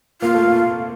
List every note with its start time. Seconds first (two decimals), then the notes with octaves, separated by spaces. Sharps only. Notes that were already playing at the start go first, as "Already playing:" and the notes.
0.21 A#3 F4
0.35 A3
0.48 A#3